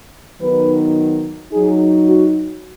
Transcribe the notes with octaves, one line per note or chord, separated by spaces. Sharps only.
D#3 F#3 B3 D#4 B4
F#3 D#4 G#4
F#4